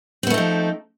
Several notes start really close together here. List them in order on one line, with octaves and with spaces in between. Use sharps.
C4 B3 A3 D#4 F3